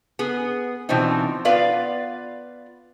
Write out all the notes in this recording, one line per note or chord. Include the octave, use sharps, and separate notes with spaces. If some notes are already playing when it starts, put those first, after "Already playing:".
B3 G#4
B2 E3 F3 C4 D4 D#4
B3 F4 B4 D5 F5